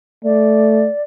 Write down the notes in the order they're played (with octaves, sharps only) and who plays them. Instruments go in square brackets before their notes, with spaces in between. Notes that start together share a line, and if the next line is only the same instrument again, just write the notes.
[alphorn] A3 [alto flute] D5